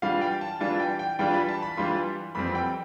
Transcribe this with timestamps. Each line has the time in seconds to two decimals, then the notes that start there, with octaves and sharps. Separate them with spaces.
0.02 E3 G3 D4 F4 F5
0.21 G5
0.41 A5
0.60 E3 G3 D4 F4 A5
0.80 G5
0.99 G5
1.19 E3 G3 D4 F4 G5
1.33 B5
1.49 A5
1.62 B5
1.77 E3 G3 D4 F4 C6
2.35 F2 E3 G3 C4 B5
2.55 G5